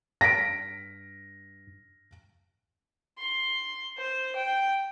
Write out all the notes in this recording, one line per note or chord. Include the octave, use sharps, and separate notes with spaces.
G2 A#6 B6 D7
C6
C5
G5